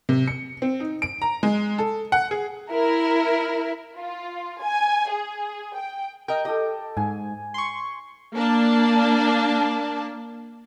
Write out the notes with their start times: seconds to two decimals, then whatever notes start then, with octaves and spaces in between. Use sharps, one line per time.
0.09 C3
0.28 C#7
0.62 C4
0.80 D#4
1.02 D7
1.22 A#5
1.43 G#3
1.78 A4
2.12 F#5
2.31 G#4
2.72 E4 A#4
3.97 F4
4.62 G#5
5.10 G#4
5.76 G5
6.28 A#4 D#5 G5
6.45 G4 A4 D#5
6.97 G#2 G#5
7.54 C6 C#6
8.33 A#3 D4